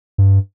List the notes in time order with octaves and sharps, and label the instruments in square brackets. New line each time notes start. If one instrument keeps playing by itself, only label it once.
[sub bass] G2